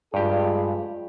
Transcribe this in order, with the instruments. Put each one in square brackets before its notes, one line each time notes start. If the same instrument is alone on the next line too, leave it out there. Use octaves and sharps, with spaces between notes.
[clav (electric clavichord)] G2 G4 [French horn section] G#3 F4 G#4